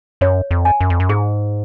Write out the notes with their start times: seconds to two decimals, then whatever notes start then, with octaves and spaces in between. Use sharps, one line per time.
0.21 F#2 C#5
0.51 F2
0.65 G#5
0.81 F#2
0.90 F2
1.00 F#2
1.09 G#2 G#4